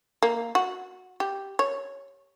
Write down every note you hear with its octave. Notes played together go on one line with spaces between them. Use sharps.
A#3
F#4
G4
C#5